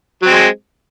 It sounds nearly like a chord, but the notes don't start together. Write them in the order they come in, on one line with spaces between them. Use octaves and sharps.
F#3 C4 G#3